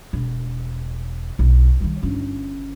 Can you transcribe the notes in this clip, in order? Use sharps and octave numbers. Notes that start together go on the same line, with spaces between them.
E1
B1
D#3 G3
G1 C#4